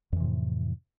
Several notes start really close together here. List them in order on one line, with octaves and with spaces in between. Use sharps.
F2 E3 C3 A2